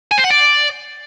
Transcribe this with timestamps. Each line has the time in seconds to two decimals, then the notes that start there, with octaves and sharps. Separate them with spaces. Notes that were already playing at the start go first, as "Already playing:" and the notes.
0.11 G#5
0.18 C5
0.24 F#5
0.30 D5